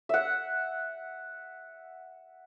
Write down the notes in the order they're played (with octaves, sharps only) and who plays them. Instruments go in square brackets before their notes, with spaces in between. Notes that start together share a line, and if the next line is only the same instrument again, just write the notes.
[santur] E5 F#5